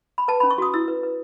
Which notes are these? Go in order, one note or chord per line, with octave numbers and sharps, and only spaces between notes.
B5
B4 A5
C#4 B5
C#6
F#4 D#6
E4 E6
B4
B4